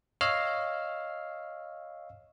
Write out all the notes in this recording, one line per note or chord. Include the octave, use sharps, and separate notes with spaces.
C#5 D#5 F5 E6 F6 C7